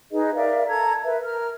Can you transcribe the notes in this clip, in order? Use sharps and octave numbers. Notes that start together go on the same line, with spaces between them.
D#4 G#4 B4 D#5
A#4 D5 E5 F5
A4 A#5 G#6
A#4 B4 E5
A#4 F6